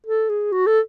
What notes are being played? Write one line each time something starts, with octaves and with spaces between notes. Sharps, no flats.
A4
G#4
F#4
A4